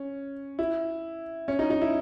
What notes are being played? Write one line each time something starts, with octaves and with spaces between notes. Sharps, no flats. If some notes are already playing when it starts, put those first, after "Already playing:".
Already playing: C#4
E4
C#4
D#4
D#4
E4